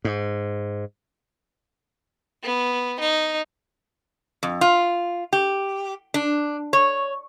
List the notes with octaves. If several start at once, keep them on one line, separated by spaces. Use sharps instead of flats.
G#2
B3
D#4
F2
F4
G4
D4
C#5